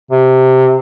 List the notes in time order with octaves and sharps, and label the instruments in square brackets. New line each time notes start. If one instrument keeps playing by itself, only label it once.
[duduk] C3